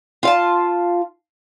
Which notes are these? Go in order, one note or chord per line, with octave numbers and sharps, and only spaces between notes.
F4 F5 A5